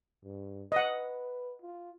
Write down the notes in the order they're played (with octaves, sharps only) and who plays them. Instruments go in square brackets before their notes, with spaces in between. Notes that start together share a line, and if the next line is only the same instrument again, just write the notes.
[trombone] G2
[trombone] B4 [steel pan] D#5 F#5
[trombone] F4